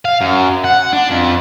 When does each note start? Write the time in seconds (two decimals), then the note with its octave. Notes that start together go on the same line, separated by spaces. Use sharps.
0.05 F5
0.21 F#2
0.64 F#5
0.93 D4
1.10 F2